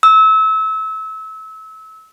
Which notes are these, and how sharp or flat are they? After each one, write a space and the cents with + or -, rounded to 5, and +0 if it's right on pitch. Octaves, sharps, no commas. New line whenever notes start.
E6 -30